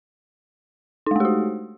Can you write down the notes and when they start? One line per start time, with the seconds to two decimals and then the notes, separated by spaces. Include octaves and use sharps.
1.06 D#4
1.11 G#3
1.16 A3
1.20 G4
1.25 F#4